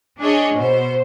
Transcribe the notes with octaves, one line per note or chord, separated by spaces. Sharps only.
D4 G#4 C#5 D#5
B2 C5